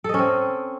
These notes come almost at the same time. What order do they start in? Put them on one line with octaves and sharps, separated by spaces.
A4 D#5 C#4 C4